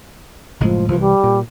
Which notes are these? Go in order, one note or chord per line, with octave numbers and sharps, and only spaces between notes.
F#1 A2 F3 G#3
C2 C3 E3 F3
G3
A#2